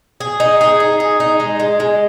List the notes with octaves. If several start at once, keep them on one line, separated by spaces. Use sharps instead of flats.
G#4
D#4
G#4
D#4
G#4
D#4
G#3
G#3
G#3